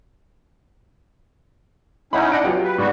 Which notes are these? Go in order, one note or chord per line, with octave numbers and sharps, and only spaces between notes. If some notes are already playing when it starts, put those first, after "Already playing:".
C#4 D#4 E4 F#5 B5
D4 D#5 F#5 D7
F#3 B3 F4 G4
B4
G#2 G3 B3 F#4